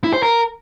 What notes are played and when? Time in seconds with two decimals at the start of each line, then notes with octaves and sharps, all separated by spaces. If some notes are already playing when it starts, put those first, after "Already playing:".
0.04 E4
0.13 C5
0.23 A#4